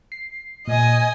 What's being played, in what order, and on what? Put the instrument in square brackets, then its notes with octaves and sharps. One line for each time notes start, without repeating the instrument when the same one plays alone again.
[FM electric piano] C7
[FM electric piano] A#2 [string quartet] D#5 G#5